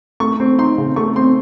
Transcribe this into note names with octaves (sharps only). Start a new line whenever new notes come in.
A3 C#6
C4
D#4 C6
C#3
A3 C#6
C4 C6